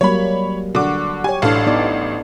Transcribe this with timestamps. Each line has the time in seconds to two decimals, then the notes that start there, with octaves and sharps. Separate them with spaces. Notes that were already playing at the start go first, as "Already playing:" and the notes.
0.01 F#3 G3 A#3 C#5 B5
0.75 D3 F#4 D6
1.24 G4 C#5 G#5
1.42 A1 D4 A4 F5
1.67 B3 D#4 D5